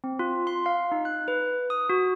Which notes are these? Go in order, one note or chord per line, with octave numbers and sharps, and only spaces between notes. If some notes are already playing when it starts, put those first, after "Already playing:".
C4
F4
C6
F5
D#4
F#6
B4
D#6
F#4